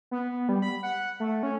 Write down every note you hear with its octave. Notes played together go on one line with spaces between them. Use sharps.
B3
G3
B5
F#5
A3
C#4